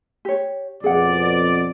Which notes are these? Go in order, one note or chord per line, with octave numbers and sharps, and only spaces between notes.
G4 C#5
F2 B2 G#4 D5 F#5